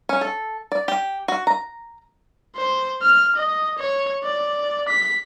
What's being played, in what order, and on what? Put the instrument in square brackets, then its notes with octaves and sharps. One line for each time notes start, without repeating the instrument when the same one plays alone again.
[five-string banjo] C#4
A4
D5
G4
F#4
A#5
[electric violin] C5
F6
D#5
C#5
D5
B6